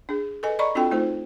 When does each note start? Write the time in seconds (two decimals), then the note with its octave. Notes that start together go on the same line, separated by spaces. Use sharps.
0.09 D4 G#4
0.43 A4 B4 D#5 G#5
0.59 D5 D#5 A#5 B5 C#6
0.75 C4 D4 F4 F#4 A4 G5
0.91 A3 D#4 F4 C5